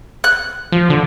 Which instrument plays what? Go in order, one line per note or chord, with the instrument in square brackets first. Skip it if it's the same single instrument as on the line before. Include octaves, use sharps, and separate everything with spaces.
[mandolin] F#6
[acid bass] F3
D3